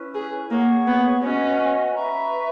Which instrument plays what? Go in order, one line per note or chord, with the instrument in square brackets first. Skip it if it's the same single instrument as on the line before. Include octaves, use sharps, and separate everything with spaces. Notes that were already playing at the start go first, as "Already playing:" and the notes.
Already playing: [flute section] C#4 E4 B4
[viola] G#4
[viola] A#3 [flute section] G#4 C#5 F#5 C#6
[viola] B3
[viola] C#4 [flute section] F#4 B4 D#5 G#5
[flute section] B4 E5 A#5 C#6